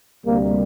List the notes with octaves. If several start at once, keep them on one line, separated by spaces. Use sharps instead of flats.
D2 C3 G3 A#3